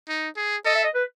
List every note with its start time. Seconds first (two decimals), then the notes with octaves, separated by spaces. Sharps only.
0.09 D#4
0.37 G#4
0.65 A4 D#5
0.75 E5
0.84 D#5
0.94 B4